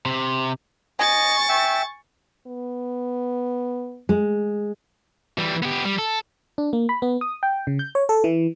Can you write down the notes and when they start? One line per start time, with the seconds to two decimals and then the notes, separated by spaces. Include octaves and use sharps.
0.06 C3
0.99 D#5 G#5 C#6 A6
1.49 E5 G5
2.47 B3
4.09 G#3
5.38 E3 G3
5.63 B3 G4
5.85 G3
5.98 A4
6.58 D4
6.73 A#3
6.89 B5
7.02 B3
7.21 D#6
7.43 G5
7.67 C#3
7.79 G6
7.95 C#5
8.09 A4
8.24 E3